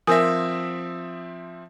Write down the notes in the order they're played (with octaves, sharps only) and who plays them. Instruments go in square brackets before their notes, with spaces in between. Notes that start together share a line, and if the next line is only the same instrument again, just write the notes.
[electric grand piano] F3 C4 E5 [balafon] A#4 G#5 [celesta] D#6 E6 A#6